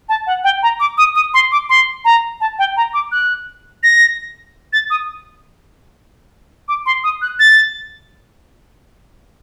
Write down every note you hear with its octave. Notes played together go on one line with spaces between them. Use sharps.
A5
F#5
G5
A#5
D6
D#6
D#6
C6
D6
C6
A#5
A5
G5
A#5
D6
F#6
A#6
A6
D#6
D6
C6
D#6
F#6
A6